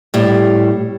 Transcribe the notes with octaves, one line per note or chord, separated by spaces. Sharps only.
A2 G3